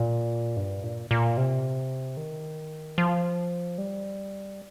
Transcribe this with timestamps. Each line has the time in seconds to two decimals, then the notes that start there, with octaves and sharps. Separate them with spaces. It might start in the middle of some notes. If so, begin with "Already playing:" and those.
Already playing: A#2
0.57 G2
0.84 A#2
1.11 A#2
1.37 C3
2.17 D#3
2.98 F3
3.78 G3